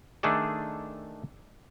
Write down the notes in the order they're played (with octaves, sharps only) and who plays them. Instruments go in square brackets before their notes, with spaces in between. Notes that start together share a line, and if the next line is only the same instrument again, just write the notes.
[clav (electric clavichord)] D#3 A3 D4 G#4 A4 D5